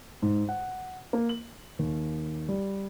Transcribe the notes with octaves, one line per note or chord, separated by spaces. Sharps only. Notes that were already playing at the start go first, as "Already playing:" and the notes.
G#2
F#5
A#3
F#7
D#2
G3